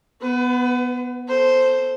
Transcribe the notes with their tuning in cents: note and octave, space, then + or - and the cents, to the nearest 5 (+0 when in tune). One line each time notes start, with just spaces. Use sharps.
B3 +0 B4 +35
A4 +0 C5 +0